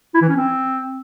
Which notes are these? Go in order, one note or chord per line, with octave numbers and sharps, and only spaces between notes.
E4
E3
C#4
C4